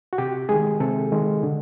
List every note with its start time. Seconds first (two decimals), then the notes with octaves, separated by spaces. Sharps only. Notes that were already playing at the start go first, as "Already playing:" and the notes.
0.13 F#4
0.18 C3 G4
0.49 D#3 G#3 G#4
0.80 C3 A4
1.12 D#3 G#3
1.43 D3